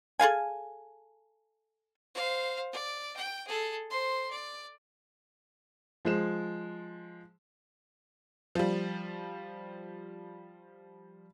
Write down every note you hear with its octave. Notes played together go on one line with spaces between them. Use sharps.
G#4 A4 F5 G#5
C5 F5
D5
G5
G#4 A4
C5 C6
D5
F3 G#3 E7
F3 G3